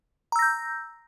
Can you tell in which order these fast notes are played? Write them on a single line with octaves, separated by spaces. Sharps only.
A#5 E6 A#6 G6